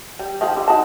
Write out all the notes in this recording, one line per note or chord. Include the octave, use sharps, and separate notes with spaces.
G3
D#3 F3 G4
D3
D#4 F#4 A5